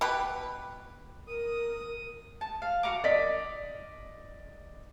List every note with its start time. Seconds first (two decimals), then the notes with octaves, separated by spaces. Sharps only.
0.01 B2 G4 B4
1.28 A#4 D#6
2.41 A5
2.62 F5
2.83 F#4 F5 A#5 D6
3.04 D5 D#5 B6